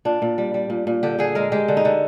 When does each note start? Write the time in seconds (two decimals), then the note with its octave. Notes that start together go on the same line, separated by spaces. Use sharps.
0.05 A#2 D4
0.22 A#2
0.38 G3
0.54 G3
0.70 A#2
0.87 A#2
1.03 D3 G4
1.19 D3 G#4
1.35 G#3 A#4
1.52 G#3 G4
1.68 D3
1.77 D#4
1.85 D3